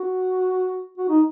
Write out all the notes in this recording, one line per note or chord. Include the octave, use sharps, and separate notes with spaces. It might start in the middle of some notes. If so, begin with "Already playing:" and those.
Already playing: F#4
F#4
D#4